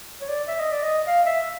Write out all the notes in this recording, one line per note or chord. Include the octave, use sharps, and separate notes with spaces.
C#5
D5
E5
D#5
D5
D#5
F5
E5